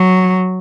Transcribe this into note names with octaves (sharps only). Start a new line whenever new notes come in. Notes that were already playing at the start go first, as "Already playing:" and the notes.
Already playing: F#3